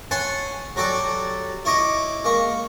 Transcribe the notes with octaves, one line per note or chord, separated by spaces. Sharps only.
C#5 F#5 G#5 A5 C6
F#3 F#4 G4 A4 D5
E4 C#5 D#5 D6
G#3 A#3 C#6